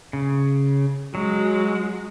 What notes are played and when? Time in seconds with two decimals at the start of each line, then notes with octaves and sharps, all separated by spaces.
0.13 C#3
1.15 F#3 G#3 F#4